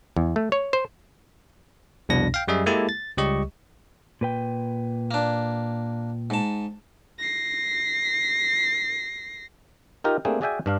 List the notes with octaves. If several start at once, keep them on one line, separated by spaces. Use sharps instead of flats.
E2
A3
C#5
C5
C2 F2 B2 D4 A#6
F5 G5
F#2 G3 G#4 D#5 E5
G#3 A#3 E4 G4 A4 A5
A6
C#2 G3 G4 D#5 C#6
A#2 B4 G5
A#3 D4
G#2 A5
A#6 C7
D#4 F4 G4 A#4
A3 A#3 C4 D4 G4 G#4
F#4 G#4 D5 E5 G5 G#5
G2 D4 F5